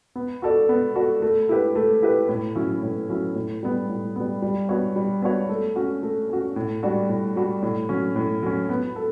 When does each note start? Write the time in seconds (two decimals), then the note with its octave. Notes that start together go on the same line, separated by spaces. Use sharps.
0.15 B3
0.42 F#4 A4 D5
0.69 B3
0.95 F#4 A4 D5
1.22 A3
1.49 E4 G4 B4
1.76 A3
2.02 E4 G4 B4
2.29 A2
2.55 F#3 C#4 E4
2.83 A2
3.09 F#3 C#4 E4
3.35 A2
3.63 G3 B3
3.89 A2
4.16 G3 B3
4.42 G3
4.69 B3 D4 F#4 C#5
4.96 G3
5.22 B3 D4 F#4 C#5
5.49 A3
5.76 C#4 F#4
6.03 A3
6.29 C#4 F#4
6.56 A2
6.83 G3 D4 F#4
7.09 A2
7.36 G3 D4 F#4
7.62 A2
7.89 F#3 C#4
8.16 A2
8.43 F#3 C#4
8.69 B3
8.96 A4